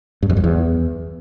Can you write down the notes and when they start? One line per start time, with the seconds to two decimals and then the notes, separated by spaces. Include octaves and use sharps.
0.22 G2
0.30 F2
0.37 F#2
0.44 E2